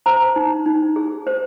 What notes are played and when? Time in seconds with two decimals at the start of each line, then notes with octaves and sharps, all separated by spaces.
0.06 C5 A#5
0.36 D#4
0.66 D#4
0.96 G#4
1.27 C5